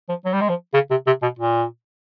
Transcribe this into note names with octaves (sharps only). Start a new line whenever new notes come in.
F3
F#3
G3
G#3
F3
C#3
C3
C3
B2
A#2